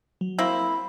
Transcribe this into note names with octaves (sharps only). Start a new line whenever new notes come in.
F#3
A#3 C4 E4